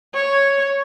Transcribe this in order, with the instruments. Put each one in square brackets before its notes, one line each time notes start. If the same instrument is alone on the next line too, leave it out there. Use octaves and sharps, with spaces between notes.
[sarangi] C#5